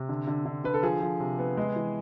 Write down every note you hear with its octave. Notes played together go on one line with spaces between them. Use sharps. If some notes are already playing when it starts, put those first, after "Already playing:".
Already playing: C3
D3
D3
D3
D3 B4
A4
F3 G#4
F3
C3
B3
G#3
E3